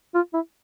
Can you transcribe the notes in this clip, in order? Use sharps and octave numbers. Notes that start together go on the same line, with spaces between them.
F4
E4